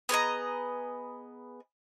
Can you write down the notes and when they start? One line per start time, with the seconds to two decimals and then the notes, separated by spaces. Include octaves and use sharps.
0.09 B3 G#4 D#5 A#5